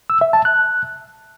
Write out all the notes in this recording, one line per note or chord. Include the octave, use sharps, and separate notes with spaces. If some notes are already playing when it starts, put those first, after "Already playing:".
E6
E5
A5
F#6